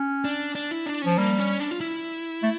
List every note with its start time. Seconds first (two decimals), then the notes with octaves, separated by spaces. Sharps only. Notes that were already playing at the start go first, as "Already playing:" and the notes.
Already playing: C#4
0.25 D4
0.55 D4
0.71 E4
0.86 D4
1.02 F3 C#4
1.18 G3 A#3
1.39 C#4
1.60 D4
1.71 F4
1.81 E4
2.43 A3